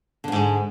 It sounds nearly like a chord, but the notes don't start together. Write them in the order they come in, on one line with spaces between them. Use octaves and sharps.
D3 F2 G#2